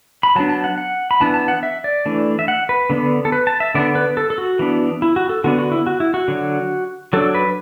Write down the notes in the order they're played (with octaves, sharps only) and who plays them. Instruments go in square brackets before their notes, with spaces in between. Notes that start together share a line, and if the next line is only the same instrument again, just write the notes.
[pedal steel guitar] B5
F#3 B3 D4 A5
A5
F#5
F#5
B5
E3 B3 D4 A5
A5
F#5
E5
D5
E3 A3 D4
E5
F#5
B4
D3 B3 D4
A4
B4
A5
E5
D3 B3 D4 D5
B4
A4
A4
F#4
E3 B3 D4
E4
F#4
A4
D3 B3 D4 F#4
F#4
E4
F#4
E4
F#4
D3 F#3 D4
F#3 D4 A4
B4